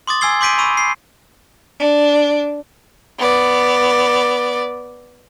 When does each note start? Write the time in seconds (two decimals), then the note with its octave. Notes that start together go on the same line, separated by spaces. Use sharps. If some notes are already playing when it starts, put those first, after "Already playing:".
0.07 C6 D6 D#6 A6
0.21 G#5 C6 E6 G#6 C7 G7
0.41 C6 D6 G6 B6 D7 D#7
0.58 B5 C#6 E6 D#7
0.77 C7
1.80 D4
3.19 B3 D5